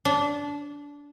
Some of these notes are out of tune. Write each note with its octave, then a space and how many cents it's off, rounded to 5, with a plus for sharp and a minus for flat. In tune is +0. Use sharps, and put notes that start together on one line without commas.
D4 -20